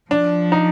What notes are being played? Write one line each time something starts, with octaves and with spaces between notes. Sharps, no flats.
F3 D4
D#4